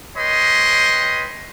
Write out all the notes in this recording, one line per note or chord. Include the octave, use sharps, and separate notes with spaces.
B4 C#5 D#5 G5 C6